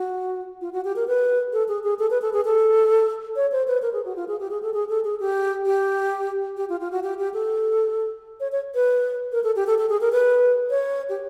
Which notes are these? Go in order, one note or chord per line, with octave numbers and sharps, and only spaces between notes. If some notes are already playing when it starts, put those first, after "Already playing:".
Already playing: F#4
F4
F#4
G4
A#4
B4
A4
G#4
G#4
A4
B4
A4
G#4
A4
C#5
C5
B4
A#4
G#4
F#4
F4
G#4
G4
G#4
A4
G#4
A4
G#4
G4
G4
G4
F4
F4
F#4
G4
G4
A4
C#5
C#5
B4
A#4
A4
G4
A4
A4
G#4
A#4
B4
C#5
G4